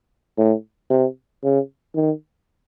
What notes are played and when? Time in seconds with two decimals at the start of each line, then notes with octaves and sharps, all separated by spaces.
0.38 A2
0.90 C3
1.43 C#3
1.95 D#3